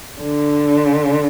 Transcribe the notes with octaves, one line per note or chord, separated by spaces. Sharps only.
D3